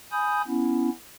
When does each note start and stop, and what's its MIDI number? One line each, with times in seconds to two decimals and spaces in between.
0.11 0.42 80
0.11 0.42 83
0.11 0.42 87
0.11 0.42 91
0.47 0.90 59
0.47 0.90 61
0.47 0.90 64